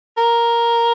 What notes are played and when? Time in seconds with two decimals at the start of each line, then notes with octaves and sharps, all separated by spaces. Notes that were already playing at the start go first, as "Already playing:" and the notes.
0.17 A#4